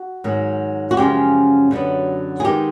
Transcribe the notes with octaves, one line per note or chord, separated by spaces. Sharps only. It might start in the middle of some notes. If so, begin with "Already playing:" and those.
Already playing: F#4
G#2 D#3 F#3
F#4
F#2 C#3 F3 G#3 C#4 G4
F#2 D3 F#3 B3
G#4
D#3 G#3 B3 D#4 G4